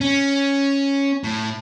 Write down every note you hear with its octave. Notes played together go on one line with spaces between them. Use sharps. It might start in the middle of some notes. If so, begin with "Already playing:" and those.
C#4
A2